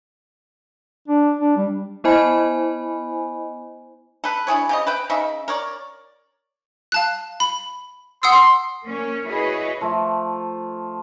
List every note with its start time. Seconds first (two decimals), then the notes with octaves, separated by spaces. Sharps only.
1.08 D4
1.39 D4
1.57 G3
2.04 B3 E4 C5 D#5 G#5 B5
4.24 A4 B4
4.47 D4 E4 G#4 C#5
4.69 C#3 G4 D#5
4.87 B4 E5 G5
5.10 C#3 D#4 E5
5.48 A#4 C#5 D5
6.92 F5 A5 F#6
7.40 B5
8.23 F#5 C6 D#6 E6
8.85 A#3 C#4 C#5
9.27 E4 F#4 G#4 B4 C#5 D#5
9.81 F3 A3